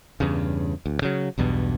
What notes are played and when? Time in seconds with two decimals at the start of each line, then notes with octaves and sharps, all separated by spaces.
0.20 E2 G2 C#3
0.86 D2
1.02 C#3 F#3
1.38 B1 E2 G2 B2